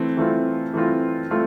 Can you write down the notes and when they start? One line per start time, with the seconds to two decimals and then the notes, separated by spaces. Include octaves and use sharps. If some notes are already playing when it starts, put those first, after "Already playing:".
Already playing: E3 A3 C4
0.17 E3 A3 C4 F4
0.74 E3 A3 C4 F4
1.31 A3 C4 F4